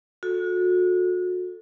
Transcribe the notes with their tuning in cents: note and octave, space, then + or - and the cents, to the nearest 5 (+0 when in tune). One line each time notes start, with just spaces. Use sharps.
F#4 -35 A4 +0